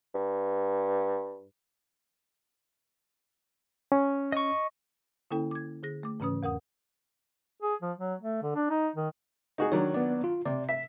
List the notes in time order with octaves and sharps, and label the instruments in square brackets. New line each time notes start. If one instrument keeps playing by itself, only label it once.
[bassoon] G2
[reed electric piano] C#4
[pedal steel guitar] D#5 C#6
[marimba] D3 A#3 C#4 E4 A4 G5
D6 G#6
D3 G#4 A#6
A3 D6
G#2 C#3 E3 C#4 B4 D#6
E2 A#4 F#5 D#6
[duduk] G#4
F3
F#3
A3
D3
D4
D#4
D#3
[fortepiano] D#4 F#4 G#4
[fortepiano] D#3 F#3 D4 [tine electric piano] C#5
[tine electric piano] B3 D5
F4
[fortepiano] C3 [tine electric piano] D5
[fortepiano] E5 [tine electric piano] B6